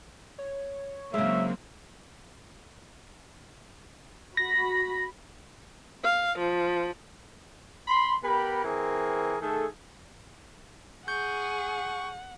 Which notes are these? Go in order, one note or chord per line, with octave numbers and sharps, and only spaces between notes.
C#5
C#3 F#3 G#3 A#3 C4 E5
F#4 B5 A#6
F5
F3
B5 C6
B3 G4 A#4 B5
E3 C4 G#4 A#4
D#3 A3 G#4 A4
G#4 F#5 C#6 G6